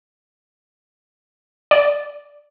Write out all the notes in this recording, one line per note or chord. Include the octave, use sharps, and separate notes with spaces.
D5